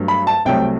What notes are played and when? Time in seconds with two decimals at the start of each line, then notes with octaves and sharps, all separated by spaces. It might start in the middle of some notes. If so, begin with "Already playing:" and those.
Already playing: G2 F#3 A3
0.08 B5
0.27 A5
0.45 C2 C3 F#3 A3 G5